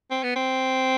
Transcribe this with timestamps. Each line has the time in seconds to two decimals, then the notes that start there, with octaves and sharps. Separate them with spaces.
0.11 C4
0.23 B3
0.36 C4